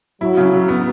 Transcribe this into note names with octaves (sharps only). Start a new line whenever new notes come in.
F#3 E4
C#3
F#3
B3